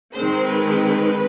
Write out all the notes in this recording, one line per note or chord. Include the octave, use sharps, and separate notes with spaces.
D#3 G#3 C4 C5
B4